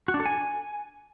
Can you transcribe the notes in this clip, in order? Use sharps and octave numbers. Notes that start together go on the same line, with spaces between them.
F#4
D4
A4
G#5